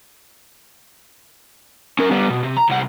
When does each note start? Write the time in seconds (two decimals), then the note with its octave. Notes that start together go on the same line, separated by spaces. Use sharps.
1.99 C#4 A#4
2.11 G3 B3
2.30 B2
2.44 C3
2.57 A#5
2.70 C2 F#5